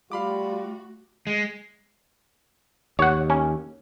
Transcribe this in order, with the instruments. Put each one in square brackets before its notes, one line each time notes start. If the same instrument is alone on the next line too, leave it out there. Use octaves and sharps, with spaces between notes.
[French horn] G3 [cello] A3 F#4 [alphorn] F4 [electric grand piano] F5 B5 D6
[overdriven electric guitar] G#3
[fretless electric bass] D#2 [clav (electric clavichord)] C#5 F#5
[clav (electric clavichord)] C#4